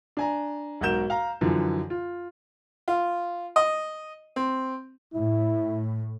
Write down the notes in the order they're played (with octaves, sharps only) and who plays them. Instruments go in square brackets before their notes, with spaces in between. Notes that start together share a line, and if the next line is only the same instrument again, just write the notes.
[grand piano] D4 G#5 A#5
B1 G#2 F#4 A#4 G6 E7
F5 A#5
F#2 D3 E3 F3
F4
[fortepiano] F4
D#5
C4
[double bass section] A2 [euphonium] E4